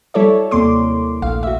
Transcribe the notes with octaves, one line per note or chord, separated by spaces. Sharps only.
F#3 G3 E4 A4 C#5 D5
D#2 C3 A#3 C6 D6
A#1 A3 F5
F#4 E5